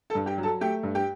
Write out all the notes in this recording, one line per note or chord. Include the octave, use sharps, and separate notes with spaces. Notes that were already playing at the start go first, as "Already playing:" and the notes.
A4 A5
G2
G4 G5
F#3
A4 A5
A3 G4 G5
G2
G4 G5